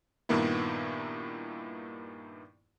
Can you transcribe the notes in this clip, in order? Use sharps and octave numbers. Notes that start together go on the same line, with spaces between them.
G2 A#2 D#3 A#3 B3 E4